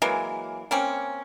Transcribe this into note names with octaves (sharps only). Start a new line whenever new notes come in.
E3 F#3 G#3 A#3
A#3 C4 C#4